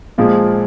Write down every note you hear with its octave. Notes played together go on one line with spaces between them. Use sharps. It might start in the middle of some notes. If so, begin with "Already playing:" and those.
A#2 F3 G#3